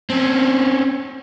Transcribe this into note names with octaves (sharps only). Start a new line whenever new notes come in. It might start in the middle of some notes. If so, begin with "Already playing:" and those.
C4 C#4